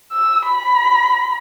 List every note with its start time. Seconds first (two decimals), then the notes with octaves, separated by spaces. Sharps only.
0.13 E6
0.47 B5